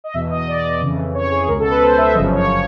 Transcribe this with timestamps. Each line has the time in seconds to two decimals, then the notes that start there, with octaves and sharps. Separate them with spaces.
0.04 D#5
0.14 E2 B2 E5
0.30 D#5
0.48 D5
0.80 F2 C#3 E3
1.14 C#5
1.31 G#4
1.47 C#2 A#4
1.51 B2
1.59 A4
1.70 B4
1.82 C5
1.98 E5
2.14 G1 F#2 C#3 F3 D#5
2.32 C#5
2.49 C#5